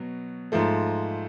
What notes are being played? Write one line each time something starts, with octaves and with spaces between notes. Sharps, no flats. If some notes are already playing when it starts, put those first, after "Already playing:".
Already playing: B2 F#3
G#2 F3 A3